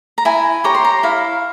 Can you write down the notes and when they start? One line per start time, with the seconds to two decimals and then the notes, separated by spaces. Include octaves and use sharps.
0.18 A#5
0.25 E4 G#5
0.64 G4 C#5 A#5
0.75 C6
0.85 A#5
1.03 E4 F5